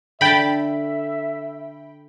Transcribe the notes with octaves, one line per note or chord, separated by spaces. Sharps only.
D3 E5 G5 A5 B5